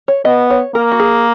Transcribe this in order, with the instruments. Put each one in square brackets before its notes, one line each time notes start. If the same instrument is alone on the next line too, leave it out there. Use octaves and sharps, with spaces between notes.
[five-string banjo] C#5
[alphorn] B3 [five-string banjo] D#5
[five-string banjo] C#5
[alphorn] A#3 [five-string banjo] A#4
[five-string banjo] F#4
G#4